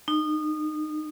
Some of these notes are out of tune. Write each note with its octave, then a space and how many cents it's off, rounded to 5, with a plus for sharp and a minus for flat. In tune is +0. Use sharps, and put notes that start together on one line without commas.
D#4 -25